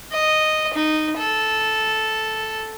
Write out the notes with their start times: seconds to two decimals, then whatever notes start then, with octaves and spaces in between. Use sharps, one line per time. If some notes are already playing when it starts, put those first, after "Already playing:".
0.12 D#5
0.74 D#4
1.18 A4